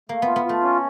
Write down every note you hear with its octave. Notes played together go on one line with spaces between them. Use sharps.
A3 A#3
B3 F4
B3
A3 F4
C#4